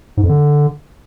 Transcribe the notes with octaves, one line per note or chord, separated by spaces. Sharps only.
G#2
F2
D3